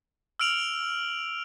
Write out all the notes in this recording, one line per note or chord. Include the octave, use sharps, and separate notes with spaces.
E6 F6 D7 F7 F#7